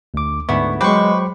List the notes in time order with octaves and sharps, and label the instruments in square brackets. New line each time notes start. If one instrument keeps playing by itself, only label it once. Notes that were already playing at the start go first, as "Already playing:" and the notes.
[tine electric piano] D2 D6
[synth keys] D2 G#2 B3 [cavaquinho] E4 [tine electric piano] C#6
[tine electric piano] F#3 G5 D6 [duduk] G#3 [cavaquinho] B4 [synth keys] C5 C#6